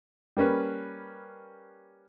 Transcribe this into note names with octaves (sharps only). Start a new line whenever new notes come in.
G3 A#3 C#4 B4